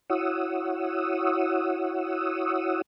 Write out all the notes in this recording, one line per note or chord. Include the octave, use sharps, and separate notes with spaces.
E4 F#4 C#5 F#5 D#6 E6